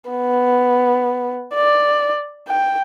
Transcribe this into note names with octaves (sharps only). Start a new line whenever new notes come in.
B3
D5
G5